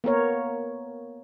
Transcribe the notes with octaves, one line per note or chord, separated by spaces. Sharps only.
A#3 B3 A#4 C#5